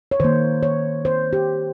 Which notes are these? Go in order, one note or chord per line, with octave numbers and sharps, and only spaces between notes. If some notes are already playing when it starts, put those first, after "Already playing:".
C#5
D#3 A#3 C5
C#5
C5
G4